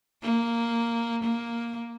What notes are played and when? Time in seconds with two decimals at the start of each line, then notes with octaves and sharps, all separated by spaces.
0.23 A#3
1.24 A#3